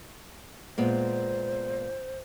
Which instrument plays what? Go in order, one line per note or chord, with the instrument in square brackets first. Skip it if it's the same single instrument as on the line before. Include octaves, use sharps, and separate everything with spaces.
[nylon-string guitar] A#2 G#3 B3 [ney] C5